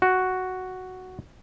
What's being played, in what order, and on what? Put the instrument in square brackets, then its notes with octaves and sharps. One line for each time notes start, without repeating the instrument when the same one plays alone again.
[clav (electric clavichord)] F#4